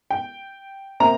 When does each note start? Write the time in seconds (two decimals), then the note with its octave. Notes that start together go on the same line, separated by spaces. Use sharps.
0.11 G5
1.00 C3 A#3 A#5